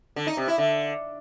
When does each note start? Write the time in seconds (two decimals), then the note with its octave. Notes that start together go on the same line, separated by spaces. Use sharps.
0.16 D3
0.27 D#4
0.37 C3
0.48 E4
0.58 D3